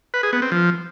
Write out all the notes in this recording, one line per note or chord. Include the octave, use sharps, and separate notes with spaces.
B4
G#4
B3
C4
F3